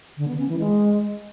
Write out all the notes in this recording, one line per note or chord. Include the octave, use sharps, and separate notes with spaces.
D3
B3
C#4
E3
G#3